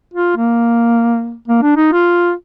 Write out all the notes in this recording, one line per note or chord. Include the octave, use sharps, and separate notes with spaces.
F4
A#3
A#3
D4
D#4
F4